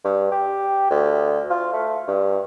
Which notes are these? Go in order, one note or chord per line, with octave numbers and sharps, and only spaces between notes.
G2
G4
D2
F4
A3
G2